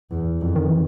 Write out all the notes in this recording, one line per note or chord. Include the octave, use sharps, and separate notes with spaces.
E2
F2
D#3
E3